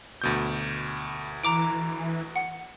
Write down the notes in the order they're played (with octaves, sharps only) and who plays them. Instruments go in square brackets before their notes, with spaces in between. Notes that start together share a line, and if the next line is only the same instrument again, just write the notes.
[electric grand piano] D2 B2 G6
[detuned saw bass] E3 [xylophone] A#5 D6 D7
[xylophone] F#5